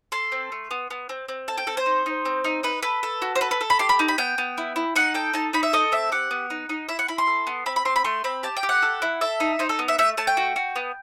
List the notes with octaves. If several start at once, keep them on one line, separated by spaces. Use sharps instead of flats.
A4 C6
C4
A3
B3
B3
C4
C4
A4 A5
G5
C4 A4
C5
D#4
D#4
C4
D#4
D#4 B4
A4 B4
A4
F#4
C5
A4 B4
B4
A4
B5
G4 C6
B5
D#4
B5
B3 G5
B3
E4
E4
D#4 F#5
A4 G5
D#4 A5
D#4 B5
E5
A4 D#5
C4 E5
G4 F#5
B3
D#4
D#4
E4 E5
F#5
E4 B5
C6
A4
B3
C4 B5
B5
C4 C6
B5
A3 C6
C4 B5
G4 A5
G5
G4
F#5
A4
E4
A4 E5
D#4
D#4 C5
A4
B3
E5
A3 E5
A3 A5
G5
F#4
F#4
B3